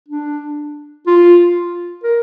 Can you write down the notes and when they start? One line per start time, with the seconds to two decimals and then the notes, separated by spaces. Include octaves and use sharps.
0.09 D4
1.07 F4
2.03 A#4